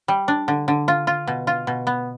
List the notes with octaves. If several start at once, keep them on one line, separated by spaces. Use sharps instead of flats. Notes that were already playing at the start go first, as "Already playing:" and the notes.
G3
D4
D3
D3
F4
F4
B2
F4
B2
B3